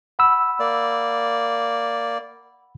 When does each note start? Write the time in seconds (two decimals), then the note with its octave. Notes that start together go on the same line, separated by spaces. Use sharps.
0.19 F#5 B5 E6
0.60 A#3 D5